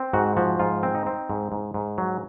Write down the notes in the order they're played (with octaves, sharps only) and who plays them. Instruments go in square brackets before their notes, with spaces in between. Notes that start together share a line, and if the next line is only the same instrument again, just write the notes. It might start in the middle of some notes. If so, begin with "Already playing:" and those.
Already playing: [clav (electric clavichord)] C4
G#2 F#4
F3 F#4
G#2 F4
C4
D#4
C4
G#2
G#2
G#2
F#3